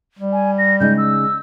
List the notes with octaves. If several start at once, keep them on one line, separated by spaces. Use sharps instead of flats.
G3
G#5
A#6
C#3 G#3 D#4 G6
E6